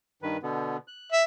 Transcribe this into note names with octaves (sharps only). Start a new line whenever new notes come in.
G2 D#3 B4
B2 D3 B3
F#6
E5